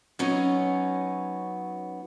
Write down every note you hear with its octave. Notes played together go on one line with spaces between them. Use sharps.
F#3 B3 C#4 D#4